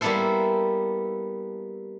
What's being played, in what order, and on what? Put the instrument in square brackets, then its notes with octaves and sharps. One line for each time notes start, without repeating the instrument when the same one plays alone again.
[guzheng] G3 A#3 B3 E4 A4 C5